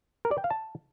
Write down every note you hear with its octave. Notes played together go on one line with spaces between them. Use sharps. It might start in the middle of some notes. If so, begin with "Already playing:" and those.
A#4
D5
G5
F5
A5